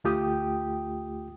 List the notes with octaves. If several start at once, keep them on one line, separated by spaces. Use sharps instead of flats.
D2 A3 F4 G4 G5 D#6